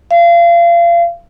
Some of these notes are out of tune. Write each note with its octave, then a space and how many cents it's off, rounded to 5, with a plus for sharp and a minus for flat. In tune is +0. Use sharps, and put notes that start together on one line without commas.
F5 -30